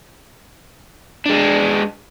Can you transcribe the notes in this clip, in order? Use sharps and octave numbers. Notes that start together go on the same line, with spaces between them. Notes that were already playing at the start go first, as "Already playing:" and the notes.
G#3 D4